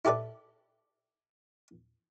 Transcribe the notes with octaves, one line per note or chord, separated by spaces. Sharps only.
E4 G4 A4 B4 D5